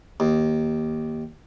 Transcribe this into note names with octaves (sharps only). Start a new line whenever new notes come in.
D#2